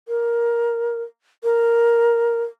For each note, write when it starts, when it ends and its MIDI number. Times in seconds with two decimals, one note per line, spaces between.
0.08 1.02 70
1.44 2.42 70